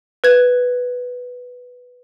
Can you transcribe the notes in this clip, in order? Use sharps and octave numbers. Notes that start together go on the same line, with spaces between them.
B4 G#6